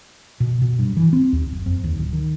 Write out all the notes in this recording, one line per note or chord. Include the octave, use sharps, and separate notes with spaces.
B2
B2
G2
E3
C4
D#2
F#1
F2
D#2
D1
D#3